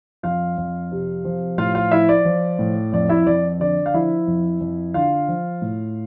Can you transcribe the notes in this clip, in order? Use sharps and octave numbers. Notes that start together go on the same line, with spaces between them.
F2 F4 F5
F2
C3
F3
A2 F4 F5
F4 F5
F3 E4 E5
D5
F3
A2
F2 D5
E4 E5
F2 D5
D3 D5
F5
F3 E4 E5
F2
F2
D3 F4 F5
F3
A2